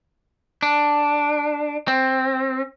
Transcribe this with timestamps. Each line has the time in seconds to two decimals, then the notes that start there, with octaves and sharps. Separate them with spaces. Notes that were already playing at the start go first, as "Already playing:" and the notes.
0.63 D4
1.88 C4